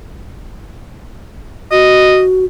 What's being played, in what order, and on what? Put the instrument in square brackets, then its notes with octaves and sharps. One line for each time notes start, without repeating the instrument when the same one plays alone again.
[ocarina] F#4 [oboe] D#5